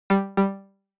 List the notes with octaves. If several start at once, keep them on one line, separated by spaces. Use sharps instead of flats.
G3
G3